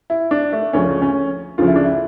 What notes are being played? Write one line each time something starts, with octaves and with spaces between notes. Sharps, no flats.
E4
D4
A3
D2 C#3 F3 C#4
C#4
D2 C#3 F3 F4
E4
D4
E4